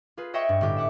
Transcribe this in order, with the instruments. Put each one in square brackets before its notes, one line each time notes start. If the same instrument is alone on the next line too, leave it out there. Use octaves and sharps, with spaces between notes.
[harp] F4 G#4 B4
C#5 D#5 E5 F#5 G5 C#6
G2
G1 A2 G4
E5 F#5 D6